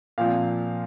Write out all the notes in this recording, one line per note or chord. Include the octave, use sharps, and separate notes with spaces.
A#2 F3 C4 F5